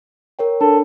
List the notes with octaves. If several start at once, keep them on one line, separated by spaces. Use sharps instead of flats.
A#4 C#5 G5
D4 A4